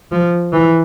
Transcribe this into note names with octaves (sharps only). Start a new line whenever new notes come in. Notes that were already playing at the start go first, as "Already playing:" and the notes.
F3
E3